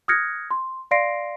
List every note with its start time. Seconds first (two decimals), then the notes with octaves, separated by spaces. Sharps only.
0.08 D#6 F6 F#6 G#6 A#6 C#7
0.51 C6
0.91 D5 F5 C6 A#6 C7 D7